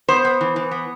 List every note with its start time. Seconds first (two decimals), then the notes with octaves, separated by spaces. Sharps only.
0.08 B3 C5
0.25 B3
0.41 E3
0.56 E3
0.71 B3